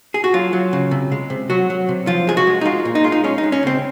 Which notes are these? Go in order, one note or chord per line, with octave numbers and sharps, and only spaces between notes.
G#4
F#4
F#3 F4
F#3
C#3
C3
G#3
C3
F#3 F#4
F#3
C3
F3 F4
G#3 G#4
F#4
G#3
D#4
G#3 F4
A#2
D#4
G#3 F4
D#4
G#3 C#4
D#4
G#3
C#4
C#3 C4